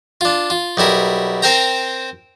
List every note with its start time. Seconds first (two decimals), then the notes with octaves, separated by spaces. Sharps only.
0.21 D4 F4
0.50 F4
0.77 B1 G3 E4 A#4
1.42 C4 A#4 C5 G5 A#5